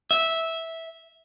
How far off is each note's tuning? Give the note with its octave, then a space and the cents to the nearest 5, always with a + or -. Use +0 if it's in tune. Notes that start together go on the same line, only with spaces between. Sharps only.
E5 -10